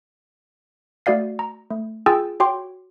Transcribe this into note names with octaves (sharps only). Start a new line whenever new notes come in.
A3 F#4 D5 F5 C7
A#5
A3
F4 G#4 G5 G#5 E6 A6
F#4 C#5 G5 C6 D6